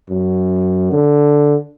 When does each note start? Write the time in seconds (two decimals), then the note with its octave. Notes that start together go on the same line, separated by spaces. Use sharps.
0.10 F#2
0.92 D3